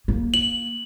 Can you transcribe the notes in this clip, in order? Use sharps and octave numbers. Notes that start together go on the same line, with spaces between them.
A#3
F#7